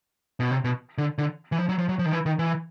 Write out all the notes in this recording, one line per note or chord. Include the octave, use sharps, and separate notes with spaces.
B2
C3
B2
D3
D3
E3
F3
F#3
F3
F#3
F3
D#3
E3
D#3
E3